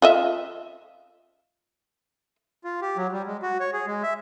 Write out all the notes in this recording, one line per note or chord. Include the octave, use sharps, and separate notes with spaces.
F4 D#5 E5
F4
G4
F#3
G3
G#3
F#4
C#5
G#4
G#3
E5